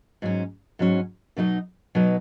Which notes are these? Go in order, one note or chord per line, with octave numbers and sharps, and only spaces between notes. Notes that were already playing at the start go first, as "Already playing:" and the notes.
G#2 F#3 C#4
G#2 F#3 C#4
B2 F#3 D#4 B4 D#5
B2 F#3 D#4 B4 D#5